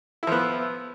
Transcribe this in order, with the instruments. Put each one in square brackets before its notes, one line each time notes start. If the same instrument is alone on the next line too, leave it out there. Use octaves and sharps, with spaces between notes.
[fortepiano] E4
F3
B3